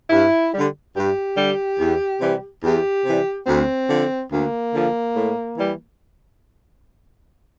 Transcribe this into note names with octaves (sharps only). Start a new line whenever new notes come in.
G2 E4
D3 G3
G2 G4
D3 G3
E2
C3 E3 G3
E2 G4
C3 E3 G3
D2 C4
D3 F3
D2 A#3
D3 F3
A2
E3 G3